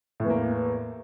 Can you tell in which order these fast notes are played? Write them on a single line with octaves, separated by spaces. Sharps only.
A2 E2 A#3